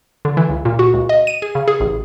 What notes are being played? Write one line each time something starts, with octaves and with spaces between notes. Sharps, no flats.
D3
E3
C#2
A#2
F#4
C#2
D#5
D#7
G#4
C#3
G#4
A1